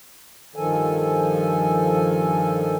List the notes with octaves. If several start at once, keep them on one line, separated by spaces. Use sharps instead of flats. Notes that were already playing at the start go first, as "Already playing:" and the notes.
G2 D#3 F3 A4 G#5